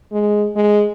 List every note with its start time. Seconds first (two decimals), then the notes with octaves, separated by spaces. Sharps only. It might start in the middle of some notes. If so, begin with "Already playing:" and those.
0.12 G#3
0.56 G#3